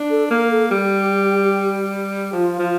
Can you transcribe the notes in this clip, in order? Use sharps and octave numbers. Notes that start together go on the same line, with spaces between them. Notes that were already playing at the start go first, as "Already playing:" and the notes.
Already playing: D4
A4
A#3 A#4
A4
G3 G4
F3 F4
F3